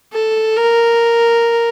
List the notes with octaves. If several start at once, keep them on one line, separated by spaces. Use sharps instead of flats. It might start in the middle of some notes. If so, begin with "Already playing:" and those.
A4
A#4